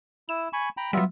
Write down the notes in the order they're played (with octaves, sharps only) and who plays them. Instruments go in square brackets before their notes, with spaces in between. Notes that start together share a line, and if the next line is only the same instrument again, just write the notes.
[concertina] E4 [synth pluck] E7
[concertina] G#5 B5 C#6
G5 A#5 B5
[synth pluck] F#3 G3 [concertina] B3 F4 E5